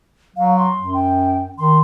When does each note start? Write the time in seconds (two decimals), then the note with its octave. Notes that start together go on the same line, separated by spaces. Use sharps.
0.36 F#3 F5
0.57 C6
0.78 F#2
0.94 G5
1.58 D#3 C6